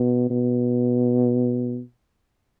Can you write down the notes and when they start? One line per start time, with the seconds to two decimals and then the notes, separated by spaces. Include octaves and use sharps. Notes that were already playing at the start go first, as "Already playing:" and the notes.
Already playing: B2
0.30 B2